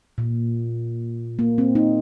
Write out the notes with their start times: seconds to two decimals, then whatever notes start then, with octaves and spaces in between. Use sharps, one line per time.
0.18 A#2
1.39 A#3
1.58 C4
1.75 D#4